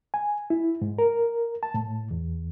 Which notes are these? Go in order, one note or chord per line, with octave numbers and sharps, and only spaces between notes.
G#5
E4
G#2
A#4
A5
A2
E2